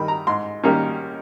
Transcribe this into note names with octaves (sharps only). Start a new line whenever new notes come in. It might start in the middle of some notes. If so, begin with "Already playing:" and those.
Already playing: D#3 G3 B5
A#5
G#2 C6
D#3 G3 A#3 C#4